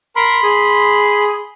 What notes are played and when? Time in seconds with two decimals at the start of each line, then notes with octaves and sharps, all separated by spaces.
0.16 A#4 B5 C6
0.43 G#4